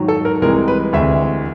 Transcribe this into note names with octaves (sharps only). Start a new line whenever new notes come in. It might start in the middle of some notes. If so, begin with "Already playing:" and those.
Already playing: G#2 D#3 F#3
A4
A#4
C2 C3 E3 G#3 A#4
B4
D2 C3 E3 G#3 E5